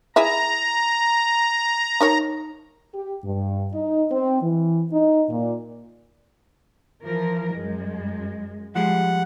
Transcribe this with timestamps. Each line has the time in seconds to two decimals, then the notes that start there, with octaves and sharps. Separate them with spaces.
0.16 E4 G#4 E5 A#5
2.01 D#4 A#4 C#5
2.94 G4
3.24 G2
3.73 D#4
4.11 C4
4.42 E3
4.92 D#4
5.29 A#2
7.03 E3 F3 A#4
7.54 F#2 G#3
8.75 F3 G3 G#3 F#5